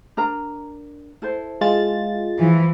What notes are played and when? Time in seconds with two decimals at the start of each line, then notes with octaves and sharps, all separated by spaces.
0.17 D4 A#4 A#5
1.22 E4 A4 C5
1.61 G#3 F4 A6
2.39 E3 F3